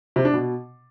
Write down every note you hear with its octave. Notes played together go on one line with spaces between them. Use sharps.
C3
D4
B2